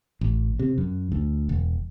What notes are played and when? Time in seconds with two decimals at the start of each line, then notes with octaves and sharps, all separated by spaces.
0.21 A1
0.59 C3
0.78 F#2
1.12 D2
1.49 E1